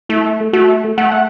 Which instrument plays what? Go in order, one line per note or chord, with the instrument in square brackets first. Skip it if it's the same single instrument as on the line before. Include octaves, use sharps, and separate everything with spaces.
[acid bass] A3 [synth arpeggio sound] E4
[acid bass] A3 [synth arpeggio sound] F#4
[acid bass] A3 [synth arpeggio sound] F#5
[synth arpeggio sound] F#5